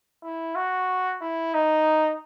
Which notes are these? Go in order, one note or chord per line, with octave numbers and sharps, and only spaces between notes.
E4
F#4
E4
D#4